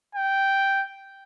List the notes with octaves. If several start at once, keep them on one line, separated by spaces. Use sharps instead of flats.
G5